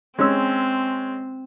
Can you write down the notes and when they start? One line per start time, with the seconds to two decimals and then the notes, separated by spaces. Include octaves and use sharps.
0.19 G#3 C4 C#4 E6